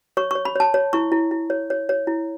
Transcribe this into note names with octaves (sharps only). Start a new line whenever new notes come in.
C#5 C#6
C#5 C#6
B5
C#5 A5
C#5
E4 C#6
E4
E4
C#5
C#5
C#5
E4